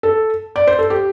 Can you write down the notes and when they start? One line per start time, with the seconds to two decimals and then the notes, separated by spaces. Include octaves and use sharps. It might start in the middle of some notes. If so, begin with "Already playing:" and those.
0.03 A4
0.56 D5
0.67 C5
0.79 A4
0.90 G4